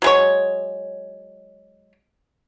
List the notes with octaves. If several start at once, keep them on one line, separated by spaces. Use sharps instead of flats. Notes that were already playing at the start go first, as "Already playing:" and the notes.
F#3 G#3 C#5